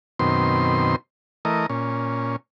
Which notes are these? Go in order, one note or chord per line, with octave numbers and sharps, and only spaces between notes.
F#2 B2 D#3 C4 C6
E3 A3 A#4 D#5
A#2 C#4